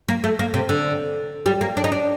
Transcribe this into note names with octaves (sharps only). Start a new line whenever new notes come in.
A#3
A3
A#3
C3
D3
G3
A#3
D4
D#4
D4